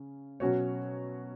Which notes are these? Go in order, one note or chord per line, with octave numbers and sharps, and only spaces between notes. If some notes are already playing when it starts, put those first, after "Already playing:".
Already playing: C#3 C#4
B2 F#3 C#4 F#4 C#5